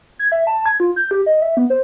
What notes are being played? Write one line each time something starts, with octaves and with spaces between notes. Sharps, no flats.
G#6
E5
A5
G#6
F4
G6
G4
D#5
E5
B3
C5